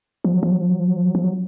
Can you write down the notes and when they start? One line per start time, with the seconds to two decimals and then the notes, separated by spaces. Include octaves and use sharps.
0.24 F3
0.34 F#3
0.43 F3
0.52 F#3
0.61 F3
0.70 F#3
0.79 F3
0.88 F#3
0.96 F3
1.06 F#3
1.15 F3
1.24 F#3